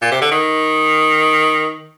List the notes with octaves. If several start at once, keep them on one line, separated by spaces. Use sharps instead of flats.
A#2
C3
D3
D#3